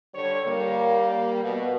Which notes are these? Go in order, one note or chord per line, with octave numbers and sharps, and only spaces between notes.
D3 G3 C#5
G3 A#3
B2